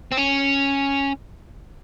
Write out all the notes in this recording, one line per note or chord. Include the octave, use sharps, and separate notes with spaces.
C4
C#4